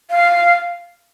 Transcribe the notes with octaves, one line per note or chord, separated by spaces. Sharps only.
F5